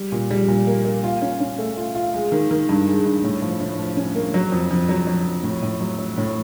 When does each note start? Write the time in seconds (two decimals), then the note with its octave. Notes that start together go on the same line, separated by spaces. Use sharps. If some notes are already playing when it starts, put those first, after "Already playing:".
Already playing: G3
0.12 A#2
0.30 G3
0.48 A#2
0.67 A#3
0.85 A#3
1.04 F4
1.22 C#4
1.40 C#4
1.58 A3
1.77 F4
1.95 F4
2.14 G#3
2.32 D#3
2.51 D#3
2.69 G2
2.88 G#3
3.06 G2
3.24 A2
3.42 F3
3.60 A2
3.79 F3
3.97 C#4
4.15 A#3
4.34 F#3
4.52 F2
4.71 F2
4.89 F#3
5.07 F#3
5.26 F2
5.43 A2
5.62 A2
5.80 F#3
5.99 F#3
6.18 A2